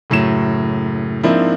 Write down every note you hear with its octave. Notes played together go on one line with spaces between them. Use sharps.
F#1 A2 F#3 E7
G#2 F3 A#3 C4 D4 E4